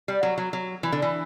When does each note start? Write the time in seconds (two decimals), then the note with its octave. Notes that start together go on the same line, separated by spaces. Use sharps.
0.08 G3
0.23 F#3
0.38 F#3
0.53 F#3
0.83 E3
0.92 D3
1.02 E3